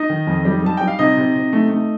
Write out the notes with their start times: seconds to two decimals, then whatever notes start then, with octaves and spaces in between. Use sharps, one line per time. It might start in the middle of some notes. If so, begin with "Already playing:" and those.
Already playing: D#4 D#5
0.10 D#3
0.27 F2
0.45 G3
0.63 G3 A5
0.77 G3 G5
0.87 F5
0.99 C3 D#4 D#5
1.17 C3
1.35 C3
1.53 A3
1.70 A3